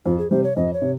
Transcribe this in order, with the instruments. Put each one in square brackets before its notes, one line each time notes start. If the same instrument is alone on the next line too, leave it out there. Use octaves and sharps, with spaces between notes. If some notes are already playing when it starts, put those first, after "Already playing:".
[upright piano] F2 [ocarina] F4
[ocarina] G#4
[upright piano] C3 G3 [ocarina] C5
[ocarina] C#5
[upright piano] F2 [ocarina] D#5
[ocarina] C#5
[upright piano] C3